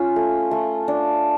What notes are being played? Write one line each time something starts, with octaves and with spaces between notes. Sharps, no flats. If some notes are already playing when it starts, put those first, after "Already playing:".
Already playing: C#4 F4
A3
A3
D4